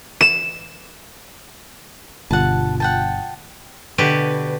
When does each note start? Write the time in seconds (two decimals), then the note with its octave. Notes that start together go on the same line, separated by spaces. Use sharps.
0.21 E7
2.31 G1 B2 G3 F4 F#5 A5
2.80 F#5 G5 A5
3.98 B2 D3 F#4 G4 B4